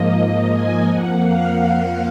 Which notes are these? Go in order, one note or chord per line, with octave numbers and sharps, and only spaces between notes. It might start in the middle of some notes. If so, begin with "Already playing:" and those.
Already playing: G#2 F3 A#3 D#5
G#5
F2 F3 A#3 F#5
F5